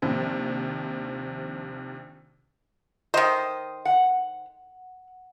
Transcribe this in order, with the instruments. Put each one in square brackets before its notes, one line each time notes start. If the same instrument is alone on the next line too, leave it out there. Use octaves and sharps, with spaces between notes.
[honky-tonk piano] A#1 D#2 C3 F3
[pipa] D#3 C5 [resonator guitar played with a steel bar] D#5
[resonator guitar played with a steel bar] F#5